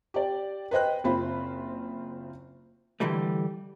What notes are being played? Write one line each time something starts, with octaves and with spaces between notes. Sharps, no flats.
G4 D5
B4 C5 D#5 G5 F#6
F#1 C4 F4 C5 B5
D3 E3 G3 A3